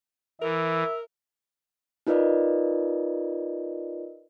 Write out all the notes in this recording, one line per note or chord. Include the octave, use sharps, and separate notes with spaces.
E3 A#4 E5
D#4 F4 A#4 B4 D5 D#5